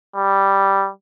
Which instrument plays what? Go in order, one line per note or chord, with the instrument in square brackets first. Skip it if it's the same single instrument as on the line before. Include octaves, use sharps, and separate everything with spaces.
[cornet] G3